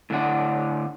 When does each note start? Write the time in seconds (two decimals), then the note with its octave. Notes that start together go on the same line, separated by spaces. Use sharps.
0.10 A2 D3 D4 F#5